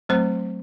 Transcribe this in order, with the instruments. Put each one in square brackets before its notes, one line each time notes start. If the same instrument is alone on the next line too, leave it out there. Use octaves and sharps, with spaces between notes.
[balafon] F#3 A3 C4 C5